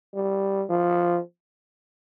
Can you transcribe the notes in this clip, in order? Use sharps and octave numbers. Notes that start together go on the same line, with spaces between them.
G3
F3